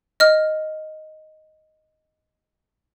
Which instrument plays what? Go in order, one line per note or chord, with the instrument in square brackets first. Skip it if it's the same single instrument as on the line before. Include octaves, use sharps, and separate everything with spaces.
[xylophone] D#5 F6